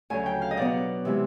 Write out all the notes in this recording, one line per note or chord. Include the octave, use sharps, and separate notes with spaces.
D2 C#3 F#3 G#5
G5
F5
D#5
B2 F#3 B3 D5
C3 E3 G#3